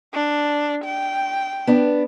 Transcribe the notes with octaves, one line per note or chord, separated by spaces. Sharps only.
D4
G5
B3 D4